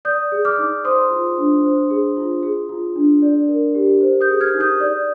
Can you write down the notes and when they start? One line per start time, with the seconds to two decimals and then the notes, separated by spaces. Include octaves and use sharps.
0.05 D5 D#6 G6
0.32 G#4
0.45 D6 F6
0.59 D#4
0.84 C5 C6 D#6
1.11 F4
1.38 D4
1.64 C5
1.91 G#4
2.17 F4
2.43 G#4
2.69 F4
2.96 D4
3.22 D5
3.49 A#4
3.75 G4
4.01 C5
4.21 D#6 G6
4.28 G#4
4.40 F6 G#6
4.54 D#4
4.60 D#6 G6
4.80 D5